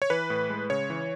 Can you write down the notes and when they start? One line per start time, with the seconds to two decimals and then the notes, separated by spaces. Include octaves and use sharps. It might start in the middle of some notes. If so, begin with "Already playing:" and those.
0.02 C#5
0.10 E3 B4
0.30 A2
0.50 G#3
0.70 C#3 C#5
0.90 E3